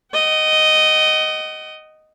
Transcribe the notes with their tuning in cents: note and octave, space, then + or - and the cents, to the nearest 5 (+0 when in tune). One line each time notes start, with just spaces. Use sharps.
D#5 +0 F#5 +40